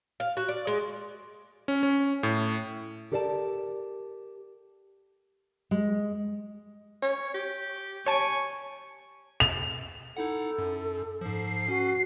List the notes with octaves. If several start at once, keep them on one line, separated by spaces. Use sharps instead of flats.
F5
F#4
D5
G#3
C#4
C#4
A2
G4 A4 A#4 D5 F#5 A5
G#3
C#5
G4
C#5 G#5 A5 C#6 D7
F7
D#4 E4 A4 F#5
F#2
G#2 F3 C7
C#4 F#4